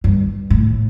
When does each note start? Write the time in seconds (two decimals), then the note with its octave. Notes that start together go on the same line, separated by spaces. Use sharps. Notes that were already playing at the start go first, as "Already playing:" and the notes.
0.04 G2
0.50 A2